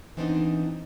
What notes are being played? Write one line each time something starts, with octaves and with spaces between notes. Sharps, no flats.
E3 B3 C4 D4 D#4